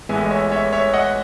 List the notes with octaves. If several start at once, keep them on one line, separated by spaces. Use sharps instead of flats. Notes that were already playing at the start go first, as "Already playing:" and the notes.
A1 A2 E3 G#3 B3 E5 G#5
D#5
C#5 E5
C#5 E5
C#5 E5
D#5 F#5